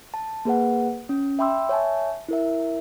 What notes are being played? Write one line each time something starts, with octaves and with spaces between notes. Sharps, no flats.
A5
A#3 G#4 B4 F#5
C#4
E5 G5 B5 C6 D6 E6
C#5 E5 G#5 A5
E4 A#4 E5